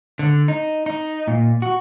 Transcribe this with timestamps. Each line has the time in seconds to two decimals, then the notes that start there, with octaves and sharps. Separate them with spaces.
0.19 D3
0.48 D#4
0.86 D#4
1.28 A#2
1.62 F#4